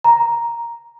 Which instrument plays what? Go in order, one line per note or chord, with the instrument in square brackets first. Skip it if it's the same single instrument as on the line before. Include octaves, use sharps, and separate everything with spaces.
[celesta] A#5